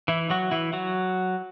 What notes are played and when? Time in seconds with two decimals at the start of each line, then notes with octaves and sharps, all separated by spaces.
0.08 E3 E4
0.30 F#3 F#4
0.51 E3 E4
0.73 F#3 F#4